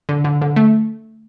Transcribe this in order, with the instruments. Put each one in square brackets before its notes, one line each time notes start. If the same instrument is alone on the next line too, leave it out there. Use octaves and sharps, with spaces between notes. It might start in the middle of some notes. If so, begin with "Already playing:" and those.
[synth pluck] D3
D3
D3
A3